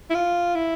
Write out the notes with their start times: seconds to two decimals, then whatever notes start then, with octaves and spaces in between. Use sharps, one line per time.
0.10 E4
0.15 F4
0.55 E4